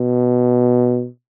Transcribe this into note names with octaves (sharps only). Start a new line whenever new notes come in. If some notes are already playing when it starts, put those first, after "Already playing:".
Already playing: B2